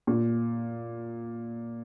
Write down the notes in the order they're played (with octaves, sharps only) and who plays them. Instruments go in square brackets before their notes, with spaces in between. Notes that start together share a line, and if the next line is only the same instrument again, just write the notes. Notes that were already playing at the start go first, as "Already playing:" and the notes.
[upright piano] A#2